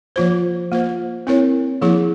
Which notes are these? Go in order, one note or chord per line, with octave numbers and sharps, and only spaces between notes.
F3 A#3 F4 C5
A#3 F4 C5
C4 E4 A#4 C#5
F3 A#3 E4 G#4